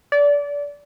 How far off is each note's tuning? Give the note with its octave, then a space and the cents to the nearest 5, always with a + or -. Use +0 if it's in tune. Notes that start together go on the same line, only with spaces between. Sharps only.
D5 -25